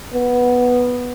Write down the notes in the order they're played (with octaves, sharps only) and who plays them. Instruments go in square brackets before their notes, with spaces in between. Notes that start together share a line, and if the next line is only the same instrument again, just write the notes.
[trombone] B3